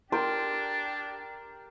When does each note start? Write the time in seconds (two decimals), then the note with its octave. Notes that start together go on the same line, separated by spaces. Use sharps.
0.12 D4 G4 A#4 G5 C6